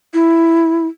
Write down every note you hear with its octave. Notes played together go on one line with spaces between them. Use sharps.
E4